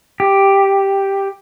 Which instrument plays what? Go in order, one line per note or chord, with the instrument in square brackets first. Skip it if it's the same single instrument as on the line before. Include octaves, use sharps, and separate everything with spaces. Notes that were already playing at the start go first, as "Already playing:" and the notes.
[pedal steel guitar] G4